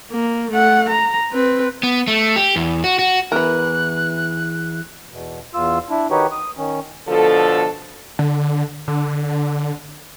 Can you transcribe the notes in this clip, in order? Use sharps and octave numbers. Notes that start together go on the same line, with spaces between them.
A#3
A3 F#5
A#5
C4 B4
B3
A3
G4
E2
F#4
F#4
E2 E3 A#4 B4 F#6
E2 B2
E2 F4 E6
D4 E4
D#3 D#4 F#4 G4 B4 C#5
D#6
D#3 C#4
B2 D3 F3 A4
D3
D3